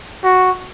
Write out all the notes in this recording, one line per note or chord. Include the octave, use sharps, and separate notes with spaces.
F#4